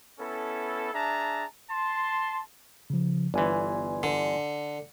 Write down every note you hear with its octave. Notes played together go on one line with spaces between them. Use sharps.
B3 C#4 E4 A4
D4 G#4 E5 A5 A#5
A5 C6
C#3 F3
G1 E3 D5 G#5 C6
D3